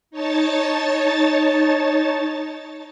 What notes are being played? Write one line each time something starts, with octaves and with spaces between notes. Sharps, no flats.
D#4 C#5 A5 A6